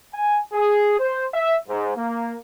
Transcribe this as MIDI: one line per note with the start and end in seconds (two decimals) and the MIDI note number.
0.14 0.39 80
0.53 0.98 68
0.99 1.25 72
1.34 1.55 76
1.68 1.93 44
1.97 2.35 58